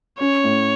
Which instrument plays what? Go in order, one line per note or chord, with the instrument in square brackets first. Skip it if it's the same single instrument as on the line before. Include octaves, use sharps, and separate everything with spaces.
[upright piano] C#4 [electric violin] C#5
[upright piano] A2